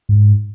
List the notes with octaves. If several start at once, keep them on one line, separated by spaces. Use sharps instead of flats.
G#2